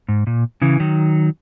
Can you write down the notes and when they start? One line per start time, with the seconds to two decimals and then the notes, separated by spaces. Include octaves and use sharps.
0.09 G#2
0.27 A#2
0.62 C#3 E3
0.80 D#3 F#3